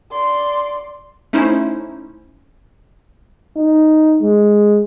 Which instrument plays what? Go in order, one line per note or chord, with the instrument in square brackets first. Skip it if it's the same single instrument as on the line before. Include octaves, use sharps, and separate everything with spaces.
[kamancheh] D5 C6
[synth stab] A3 C#4 D#4 E4 C5
[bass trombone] D#4
G#3